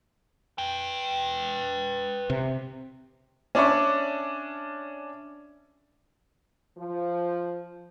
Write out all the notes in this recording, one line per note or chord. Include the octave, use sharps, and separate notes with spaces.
B4 G5
C3
C#4 D4 D5 E5 C#6
F3